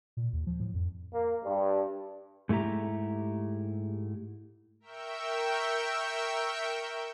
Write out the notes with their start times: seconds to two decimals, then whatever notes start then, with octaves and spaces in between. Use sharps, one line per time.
0.17 A#2
0.33 D#2
0.47 F3
0.60 A2
0.74 F2
1.13 A#3
1.43 G2
2.49 G#2 A3 E4 G4 A#5
4.80 A#4 E5 G5 C#6 E6 G6